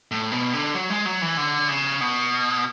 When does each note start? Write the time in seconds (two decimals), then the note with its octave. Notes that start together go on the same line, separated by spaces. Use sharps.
0.11 A2
0.32 B2
0.53 D3
0.75 F#3
0.90 G#3
1.05 F#3
1.22 E3
1.37 D3
1.68 C#3
2.01 B2